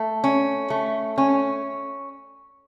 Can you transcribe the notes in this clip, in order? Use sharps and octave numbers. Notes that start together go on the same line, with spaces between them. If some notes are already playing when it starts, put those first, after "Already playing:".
Already playing: A3
C#4
A3
C#4